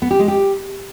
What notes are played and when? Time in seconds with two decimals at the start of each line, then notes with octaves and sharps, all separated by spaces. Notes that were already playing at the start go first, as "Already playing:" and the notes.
0.02 B3
0.11 G4
0.19 G#3
0.28 G4